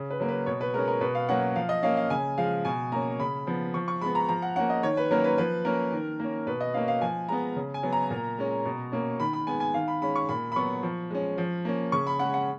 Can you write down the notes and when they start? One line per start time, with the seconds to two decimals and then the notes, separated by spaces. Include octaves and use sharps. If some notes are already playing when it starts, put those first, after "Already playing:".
Already playing: C#3
0.10 B4
0.20 F#3 A#3
0.29 B4
0.46 B2 C#5
0.61 B4
0.74 G#3 C#4 A#4
0.88 A#4
1.01 B2 B4
1.15 F5
1.29 F#3 A#3 C#4 F#5
1.56 F3 F5
1.69 D#5
1.83 A#3 C#4 F5
1.97 F5
2.10 C#3 G#5
2.38 F3 G#3 F5
2.65 B2 G#5
2.92 A#3 C#4 A#5
3.19 C#3 B5
3.47 F3 B3
3.74 F3 C#6
3.88 C#6
4.01 G#3 B3 B5
4.15 A#5
4.29 F3 A#5
4.42 F#5
4.56 A#3 C#4 F#5
4.70 D#5
4.83 D#3 C#5
4.97 B4
5.11 F#3 A#3 C#4 A#4
5.24 B4
5.38 F3 B4
5.65 A#3 C#4 A#4
5.92 D#3
6.20 A#3 C#4
6.47 B2 B4
6.61 D#5
6.74 A#3 C#4 F5
6.88 F5
7.01 F3 G#5
7.29 G#3 B3 A#5
7.56 C#3
7.74 G#5
7.83 F#3 B3
7.93 A#5
8.10 A#2
8.38 G#3 C#4
8.65 B2
8.92 A#3 C#4
9.19 D#3 B5
9.33 B5
9.47 G#3 B3 G#5
9.60 G#5
9.74 D#3 F5
9.88 B5
10.02 G#3 C#4 B5
10.16 C#6
10.29 A#2 B5
10.52 B5
10.56 F#3 B3 C#6
10.83 F3
11.10 G#3 C#4
11.38 F3
11.65 A#3 C#4
11.92 C#3 C#6
12.07 B5
12.19 G#3 C#4 F#5
12.34 F#5